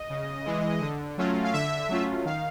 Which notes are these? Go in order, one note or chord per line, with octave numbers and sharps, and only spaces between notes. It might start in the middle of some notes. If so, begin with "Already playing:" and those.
Already playing: D#5
C#3
E3 G#3
D3
F#3 A3 C#4 F4
F5
D3 E5
F#3 A3 C#4 F4
D#3 F5